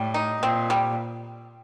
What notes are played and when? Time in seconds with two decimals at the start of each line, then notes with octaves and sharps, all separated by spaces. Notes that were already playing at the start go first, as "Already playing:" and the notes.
Already playing: A2 G3
0.14 D#4
0.42 A#2 C4
0.70 G3